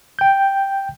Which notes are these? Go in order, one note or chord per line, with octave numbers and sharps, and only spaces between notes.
G5 G6